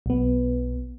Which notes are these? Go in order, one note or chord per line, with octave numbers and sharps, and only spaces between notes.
B1 B3